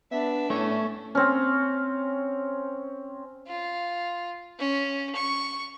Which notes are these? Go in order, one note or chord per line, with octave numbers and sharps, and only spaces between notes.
B3 D4 E5
A2 A3 C#4
C4 C#4
F4
C#4
C#6